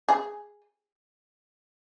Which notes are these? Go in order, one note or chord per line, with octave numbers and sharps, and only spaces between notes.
G#4